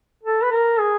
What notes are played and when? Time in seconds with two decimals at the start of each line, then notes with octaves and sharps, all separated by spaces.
0.23 A4
0.43 B4
0.51 A#4
0.80 G#4